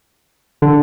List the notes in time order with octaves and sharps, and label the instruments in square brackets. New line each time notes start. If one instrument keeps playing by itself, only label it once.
[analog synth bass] D3